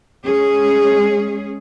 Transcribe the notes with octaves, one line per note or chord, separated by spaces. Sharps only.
G#3 C#4 G#4